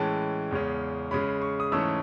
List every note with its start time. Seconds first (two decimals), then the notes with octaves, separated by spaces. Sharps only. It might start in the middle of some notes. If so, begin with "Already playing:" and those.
Already playing: A2 E3 G#3 C#4 A5
0.51 E2 C#3 G#3 C#4
1.11 C#3 G#3 C#4 B5
1.42 C#6
1.60 D#6
1.72 G#2 E3 A3 C#4 E6